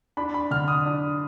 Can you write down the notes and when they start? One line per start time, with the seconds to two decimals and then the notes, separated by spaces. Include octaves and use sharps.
0.17 D4 B5
0.34 B5
0.51 D3 F6
0.68 D#6
0.86 D4